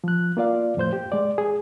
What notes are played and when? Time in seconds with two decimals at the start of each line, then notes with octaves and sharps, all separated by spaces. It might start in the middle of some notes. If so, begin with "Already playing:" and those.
0.04 F3 F#6
0.37 A#3 F4 D5 F5
0.77 F2 A2 C5 G6
0.93 G4
1.12 G#3 D5
1.38 G#4